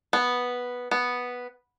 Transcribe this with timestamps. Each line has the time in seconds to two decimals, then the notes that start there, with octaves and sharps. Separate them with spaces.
0.13 B3
0.91 B3